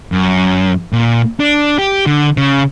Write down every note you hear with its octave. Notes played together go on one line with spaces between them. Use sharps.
F#2
A#2
D4
G4
D3
C#3